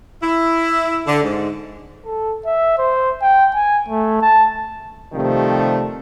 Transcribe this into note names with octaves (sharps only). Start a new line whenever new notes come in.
E4
D3
G#2
A4
E5
C5
G5
G#5
A3
A5
C3 D#3 F3 G3 A3